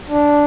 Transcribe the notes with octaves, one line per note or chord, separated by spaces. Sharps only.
D4